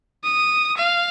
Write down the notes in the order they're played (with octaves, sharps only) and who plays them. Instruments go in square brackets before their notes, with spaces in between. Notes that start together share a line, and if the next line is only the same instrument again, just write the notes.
[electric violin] D#6
F5